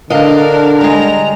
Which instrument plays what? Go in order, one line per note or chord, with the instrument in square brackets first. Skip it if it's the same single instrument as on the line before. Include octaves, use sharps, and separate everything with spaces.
[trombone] D3 [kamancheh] D4 A#4 [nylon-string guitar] D#5 F5
[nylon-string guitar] G3 G#3 [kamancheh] A#5